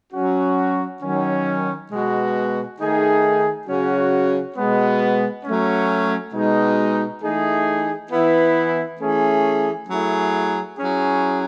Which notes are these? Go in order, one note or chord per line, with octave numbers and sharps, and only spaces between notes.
F#3 C#4 F#4
D#3 F#3 C#4
B2 G#3 B3 F#4
D#3 A3 D#4 G#4
C#3 F#3 C#4 F#4
B2 G#3 B3
F#3 A3 C#4
B2 G#3 D#4
E3 A3 D#4 G#4
E3 B3 E4
E3 A3 C#4 G#4
F#3 A3 E4 G#4
F#3 C#4 E4 G#4